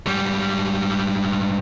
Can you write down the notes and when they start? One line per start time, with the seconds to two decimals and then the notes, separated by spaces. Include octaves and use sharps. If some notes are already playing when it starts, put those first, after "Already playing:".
0.06 G#2 G3